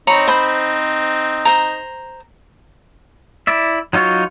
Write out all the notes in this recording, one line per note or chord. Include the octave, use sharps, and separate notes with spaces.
C4 D#4 C#5 A#5 B5
C5 B5
C5 A#5
E4 D5 E5
F#3 D#4 F4 F#4 C#5